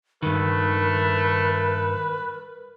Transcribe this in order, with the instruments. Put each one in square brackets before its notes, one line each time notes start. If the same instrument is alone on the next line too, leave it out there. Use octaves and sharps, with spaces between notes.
[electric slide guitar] G2 D#3 [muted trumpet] A3 [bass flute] A#4 [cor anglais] B4